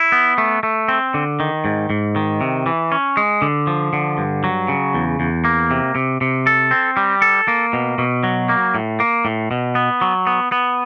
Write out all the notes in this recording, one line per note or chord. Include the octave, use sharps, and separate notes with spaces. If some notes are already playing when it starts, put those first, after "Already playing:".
Already playing: E4
B3
A3
A3
C4
D3
D#3
G#2
G#2
D#3
C3
E3
C#4
G#3
D3
F3
D3
G2
F#3
C#3
E2
E2
A#3
C3
C3
C3
A4
C4
G3
A4
A#3
B2
B2
F#3
A#3
A2
A#3
A2
B2
B3
F#3
B3
B3